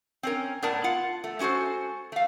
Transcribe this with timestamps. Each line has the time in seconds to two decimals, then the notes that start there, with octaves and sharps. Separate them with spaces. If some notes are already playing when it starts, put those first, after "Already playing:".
0.23 C4 C#4 A#4
0.63 A2 B3 A#4 D5 A5
0.84 F4 F#5
1.24 A3
1.39 G#3 C#4 F#4 A4 C5
2.12 A3 F5